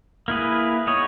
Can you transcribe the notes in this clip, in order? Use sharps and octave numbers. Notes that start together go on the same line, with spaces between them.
A#3 E4 G#4 B4
B3 D#4 G#4 C#5